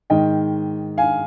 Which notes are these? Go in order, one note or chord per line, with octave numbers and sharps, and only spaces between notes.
G#2 D#3 D#5 G5
F5 G#5